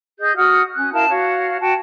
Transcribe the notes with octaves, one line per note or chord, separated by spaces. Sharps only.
G#4 D#5 G6
F#4 F#5 D#6 F6
C#4 F#6
E4 A#4 F5 A5
F#4 C#5 F5
F#4 G5 A5